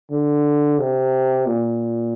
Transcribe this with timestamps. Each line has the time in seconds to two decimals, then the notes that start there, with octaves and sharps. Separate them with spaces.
0.10 D3
0.79 C3
1.46 A#2